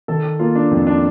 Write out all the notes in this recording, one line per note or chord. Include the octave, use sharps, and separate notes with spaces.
D#3 A4
A#3 F4
D4
F2
D4